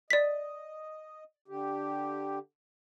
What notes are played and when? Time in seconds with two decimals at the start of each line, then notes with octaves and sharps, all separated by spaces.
0.10 D5 D#5 B6
1.48 D3 G4